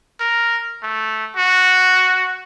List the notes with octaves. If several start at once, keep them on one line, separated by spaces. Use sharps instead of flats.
A#4
A3
F#4